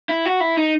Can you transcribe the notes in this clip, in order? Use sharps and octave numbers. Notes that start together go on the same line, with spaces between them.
E4
F#4
E4
D#4